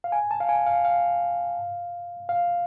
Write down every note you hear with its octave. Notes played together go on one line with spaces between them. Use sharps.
F5
G#5
A5
F5
G#5
F5
F5
F5